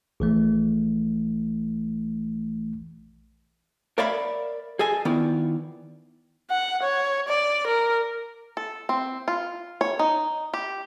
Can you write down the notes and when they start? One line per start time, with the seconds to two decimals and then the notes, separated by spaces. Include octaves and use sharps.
0.20 A#1 E3 A3
3.98 A#4 C#5 D5 E5 F5 B5
4.79 G#4 A4 D#5 G#5
5.05 D#3 B3 E4 F4 D5
6.51 F#5
6.83 C#5
7.28 D5
7.67 A#4
8.57 A4
8.89 C4
9.28 F4
9.81 C#5
9.99 D#4
10.54 G4